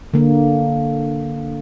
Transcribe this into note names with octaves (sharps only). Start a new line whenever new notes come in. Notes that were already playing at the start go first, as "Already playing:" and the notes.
D3 A#3